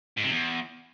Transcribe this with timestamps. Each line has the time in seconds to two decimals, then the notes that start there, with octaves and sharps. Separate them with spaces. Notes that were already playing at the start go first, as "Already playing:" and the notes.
0.17 G#2
0.24 C3
0.31 E2